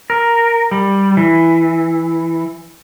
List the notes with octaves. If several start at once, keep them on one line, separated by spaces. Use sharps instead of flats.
A#4
G3
E3